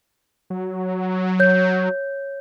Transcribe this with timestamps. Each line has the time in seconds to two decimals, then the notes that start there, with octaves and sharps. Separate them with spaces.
0.50 F#3
1.40 C#5 G6